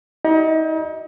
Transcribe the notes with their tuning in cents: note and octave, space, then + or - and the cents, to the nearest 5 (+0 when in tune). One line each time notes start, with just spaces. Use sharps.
D#4 +40 F#4 +40 D#5 -40